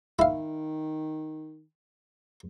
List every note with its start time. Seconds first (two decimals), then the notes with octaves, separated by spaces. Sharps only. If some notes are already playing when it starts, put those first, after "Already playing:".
0.19 D#3 E4 F5